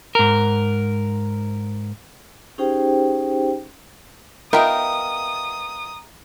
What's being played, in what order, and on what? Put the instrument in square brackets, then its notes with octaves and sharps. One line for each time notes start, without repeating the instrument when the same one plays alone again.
[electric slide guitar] G#2 A#4
[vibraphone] C#4 D#4 G4 G#4 C5 G5
[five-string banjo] B3 D#4 F4 [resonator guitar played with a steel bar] A#4 E5 G5 [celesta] A#5 [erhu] D#6